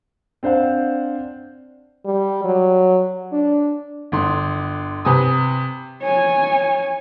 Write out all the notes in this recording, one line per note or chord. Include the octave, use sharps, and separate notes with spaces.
C4 D4 C5 F5 F#5
G3
F#3
D4
G1 D3 C6
C3 B4 G#5 D#6
C#5 G#5